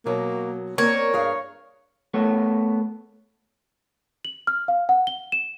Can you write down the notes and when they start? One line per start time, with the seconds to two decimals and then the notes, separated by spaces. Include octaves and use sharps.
0.06 B2 F#3 A#3
0.78 A#3 C4 A#4 C#5 D5
1.13 G2 G#4 F5
2.14 A3 B3 C#5
4.25 F#7
4.47 F6
4.68 F5
4.89 F#5
5.07 G7
5.32 E7